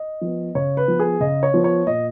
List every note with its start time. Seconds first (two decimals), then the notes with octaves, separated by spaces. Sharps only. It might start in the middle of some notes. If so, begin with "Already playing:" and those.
Already playing: D#5
0.21 F3 B3
0.55 C#3 C#5
0.77 B4
0.88 F3 B3
1.00 G#4
1.20 C#3 D#5
1.43 C#5
1.54 F3 B3
1.64 C#5
1.87 A#2 D#5